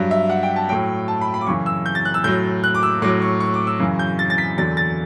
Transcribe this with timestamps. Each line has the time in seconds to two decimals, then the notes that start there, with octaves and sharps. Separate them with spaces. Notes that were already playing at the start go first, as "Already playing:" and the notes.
Already playing: G2 F#3
0.11 E5
0.30 F#5
0.43 G5
0.56 A5
0.69 A2 F#3 G5
1.08 A5
1.21 B5
1.34 B5
1.41 D6
1.47 F#2 C#3 E3 C#6
1.66 E6
1.86 G6
1.95 A6
2.05 F#6
2.14 E6
2.24 A2 F#3 G6
2.64 F#6
2.75 D6
2.83 E6
3.02 A2 F#3 D6
3.22 C#6
3.40 C#6
3.54 D6
3.67 E6
3.80 F#2 C#3 E3
3.99 G6
4.19 A6
4.30 A6
4.38 B6
4.57 E2 D3 F#3 A6
4.77 A6